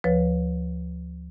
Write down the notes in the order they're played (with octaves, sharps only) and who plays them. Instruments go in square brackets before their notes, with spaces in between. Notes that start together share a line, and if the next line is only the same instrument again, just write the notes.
[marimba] D2 F3 B4 C#5